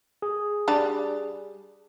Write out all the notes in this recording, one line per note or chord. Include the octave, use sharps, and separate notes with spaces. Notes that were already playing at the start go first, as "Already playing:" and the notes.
G#4
G3 D4 D5